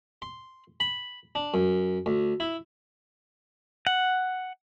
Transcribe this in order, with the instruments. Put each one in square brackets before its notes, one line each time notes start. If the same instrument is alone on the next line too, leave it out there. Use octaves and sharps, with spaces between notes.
[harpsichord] C6
B5
D4
F#2
D2
E4
[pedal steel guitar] F#5